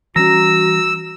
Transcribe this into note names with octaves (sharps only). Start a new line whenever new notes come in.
E3 G3 C#4 F#4 A#5 E6